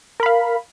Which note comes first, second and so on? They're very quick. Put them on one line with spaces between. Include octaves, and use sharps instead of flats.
A#4 B5 F5